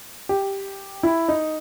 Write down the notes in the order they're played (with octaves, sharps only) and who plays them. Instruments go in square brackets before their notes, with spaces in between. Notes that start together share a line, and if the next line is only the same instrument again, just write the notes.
[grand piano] G4
E4
D#4